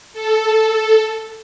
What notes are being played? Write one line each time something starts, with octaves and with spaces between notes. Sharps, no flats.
A4